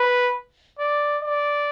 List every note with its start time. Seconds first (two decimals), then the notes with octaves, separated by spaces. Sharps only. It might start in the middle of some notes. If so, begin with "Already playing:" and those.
Already playing: B4
0.79 D5
1.22 D5